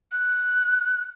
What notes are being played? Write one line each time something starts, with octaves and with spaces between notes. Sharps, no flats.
F#6